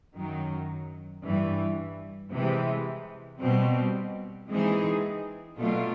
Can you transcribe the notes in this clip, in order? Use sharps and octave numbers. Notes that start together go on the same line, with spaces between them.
F#2 D#3 F#3
G2 E3 G3
C3 E3 G#3
B2 G3 C4
E3 G#3 C4 D#4 G#4
B2 F#3 A3 D4 F4